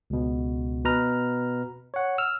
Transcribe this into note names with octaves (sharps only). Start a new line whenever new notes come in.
C#2 B2
B2 B4 A#5 F6
C#5 F#5
E6 F6